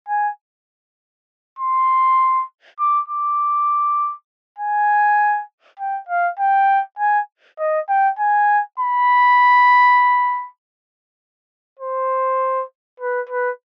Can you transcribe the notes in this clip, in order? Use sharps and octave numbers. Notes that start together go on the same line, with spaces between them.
G#5
C6
D6
D6
G#5
G5
F5
G5
G#5
D#5
G5
G#5
B5
C5
B4
B4